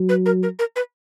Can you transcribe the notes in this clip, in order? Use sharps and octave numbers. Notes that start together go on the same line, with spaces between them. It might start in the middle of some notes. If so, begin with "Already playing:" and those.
Already playing: F#3
B4
A#4
A#4
A#4
B4